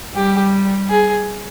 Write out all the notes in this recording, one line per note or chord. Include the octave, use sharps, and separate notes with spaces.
G3 G4
G#4